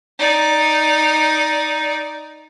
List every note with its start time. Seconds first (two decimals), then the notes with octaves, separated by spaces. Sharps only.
0.19 D#4 D5